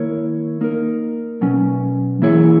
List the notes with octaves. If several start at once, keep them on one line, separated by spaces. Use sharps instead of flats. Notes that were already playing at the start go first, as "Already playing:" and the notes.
Already playing: D#3 A#3 E4 A#4 C#5
A#3 D#4 A#4
B2 F#3 C#4
E3 A#3 E4 G#4 C#5